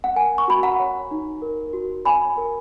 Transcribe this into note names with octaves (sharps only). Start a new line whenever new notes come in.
F#5
A#4 G#5
C#6
F#4 B5
F#5 A#5
C#5
D#4
A#4
F#4
C#5 G#5 B5
A#4